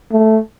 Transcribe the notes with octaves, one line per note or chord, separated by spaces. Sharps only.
A3